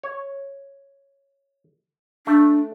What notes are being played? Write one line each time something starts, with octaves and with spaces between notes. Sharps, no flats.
C#5
A3 D4